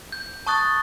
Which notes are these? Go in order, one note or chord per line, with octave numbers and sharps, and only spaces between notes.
G6
A5 C#6 D#6 F#6 A6